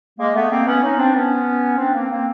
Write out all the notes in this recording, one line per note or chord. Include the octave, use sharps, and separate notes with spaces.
G#3 A#3
A3 B3
A#3 C4
B3 C#4
C#4 D#4
C4 D4
B3 C#4
C4 D4
A#3 C4
A#3 C4